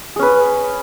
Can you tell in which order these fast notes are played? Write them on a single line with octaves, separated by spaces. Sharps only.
G#4 C#4 B4